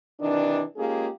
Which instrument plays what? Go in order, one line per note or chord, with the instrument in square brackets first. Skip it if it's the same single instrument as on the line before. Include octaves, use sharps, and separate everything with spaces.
[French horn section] C3 D#3 E3 D4
G#3 A#3 C#4 F4 G4 G#4